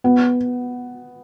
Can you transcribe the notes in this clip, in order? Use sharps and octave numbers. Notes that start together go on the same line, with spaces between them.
B3